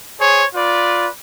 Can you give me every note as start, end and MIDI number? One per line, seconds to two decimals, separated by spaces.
0.20 0.43 68
0.20 0.43 72
0.20 0.43 73
0.55 1.07 65
0.55 1.07 71
0.55 1.07 74